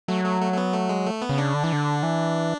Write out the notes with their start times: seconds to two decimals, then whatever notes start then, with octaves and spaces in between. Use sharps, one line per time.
0.08 F#3 A3
0.24 A3
0.41 A3
0.52 A3
0.57 B3
0.73 A3
0.89 G#3
1.06 A3
1.22 B3
1.29 C#3
1.38 D4
1.54 D3
1.64 E3
1.73 D3
2.03 E3